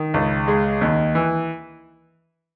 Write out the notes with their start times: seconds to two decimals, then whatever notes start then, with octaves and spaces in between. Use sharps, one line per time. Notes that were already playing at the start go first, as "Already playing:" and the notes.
Already playing: D#3
0.14 C#2
0.48 G#3
0.81 D#2
1.15 E3